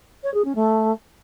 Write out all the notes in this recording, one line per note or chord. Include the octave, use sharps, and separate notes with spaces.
C#5
G#4
C#4
A3